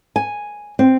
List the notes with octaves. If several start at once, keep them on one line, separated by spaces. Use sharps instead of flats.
G#5
C4